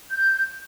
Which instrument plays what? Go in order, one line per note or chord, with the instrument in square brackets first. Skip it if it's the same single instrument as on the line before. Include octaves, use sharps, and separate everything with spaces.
[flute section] G6